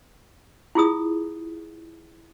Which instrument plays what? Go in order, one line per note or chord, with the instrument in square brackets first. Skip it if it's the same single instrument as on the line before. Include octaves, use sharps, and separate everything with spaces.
[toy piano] E4 F4 G#4 D#6